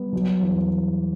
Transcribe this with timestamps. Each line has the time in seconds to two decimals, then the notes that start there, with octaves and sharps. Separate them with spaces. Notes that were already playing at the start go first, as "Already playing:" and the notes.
Already playing: G3 B3
0.13 F#3
0.41 E2